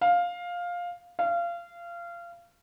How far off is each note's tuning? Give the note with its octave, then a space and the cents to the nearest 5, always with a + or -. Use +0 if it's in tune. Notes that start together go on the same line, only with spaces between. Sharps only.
F5 +10
F5 -25